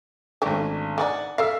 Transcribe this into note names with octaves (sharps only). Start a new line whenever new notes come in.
G#1 D#3 A3 C#4 D4 G4
D#3 D#4 D5 F#5 G#5
A4 A#4 E5 F5 E6 C7